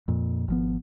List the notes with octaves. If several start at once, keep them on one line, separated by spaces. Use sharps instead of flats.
F2 A#2
G#1 F3 B3